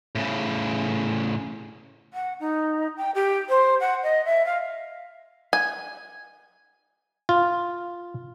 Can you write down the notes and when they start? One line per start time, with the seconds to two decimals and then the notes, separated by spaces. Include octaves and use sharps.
0.15 A2 C#3
2.13 F#5
2.40 D#4
2.97 G5
3.14 G4
3.49 C5
3.80 F#5
4.03 D#5
4.25 E5
4.46 F5
5.53 G#5
7.29 F4